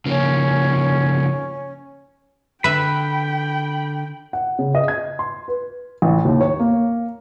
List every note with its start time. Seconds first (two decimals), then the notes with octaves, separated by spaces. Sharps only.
0.06 C#3 F3 A#3 C#4
2.64 D3 B4 E5 G5 B5
4.33 F#5
4.59 C#3
4.75 D#5
4.88 G#6
5.19 C6
5.48 B4
6.02 A1
6.25 D#2
6.41 C#5
6.60 A#3